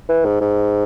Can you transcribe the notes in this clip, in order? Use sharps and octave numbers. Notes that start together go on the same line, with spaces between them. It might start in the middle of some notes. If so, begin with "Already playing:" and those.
E3
G#2
G#2